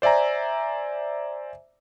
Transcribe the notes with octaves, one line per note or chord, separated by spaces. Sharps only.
C5 D5 E5 G#5 A#5